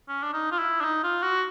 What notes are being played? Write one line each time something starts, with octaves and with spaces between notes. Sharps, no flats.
C#4
D4
D#4
F4
E4
D4
D#4
F4
F#4